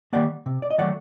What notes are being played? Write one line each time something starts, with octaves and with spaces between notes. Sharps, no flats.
D#3 G3 A#3 D5 F#5
C3
D5
D#5
D#3 F#3 A3 D5 F#5